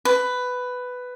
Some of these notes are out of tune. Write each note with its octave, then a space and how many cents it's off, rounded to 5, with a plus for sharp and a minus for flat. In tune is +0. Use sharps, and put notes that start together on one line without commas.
B4 +10